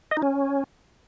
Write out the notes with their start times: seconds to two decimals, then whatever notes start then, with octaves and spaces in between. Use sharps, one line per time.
0.11 D#5
0.17 D#4
0.22 C#4